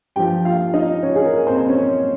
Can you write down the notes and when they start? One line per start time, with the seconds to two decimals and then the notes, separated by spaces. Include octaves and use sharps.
0.16 G2 F3 G4 G5
0.45 F4 F5
0.73 D#4 D#5
1.02 C#4 C#5
1.16 G#4
1.25 A#4
1.47 C4 C5
1.58 C5
1.68 C#4 C#5